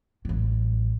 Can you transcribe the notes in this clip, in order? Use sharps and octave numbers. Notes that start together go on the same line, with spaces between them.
A1 F#3